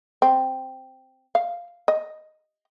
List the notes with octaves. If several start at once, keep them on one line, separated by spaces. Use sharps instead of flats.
C4
F5
D#5